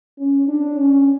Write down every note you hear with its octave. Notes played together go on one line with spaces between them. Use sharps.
C#4
D4
C#4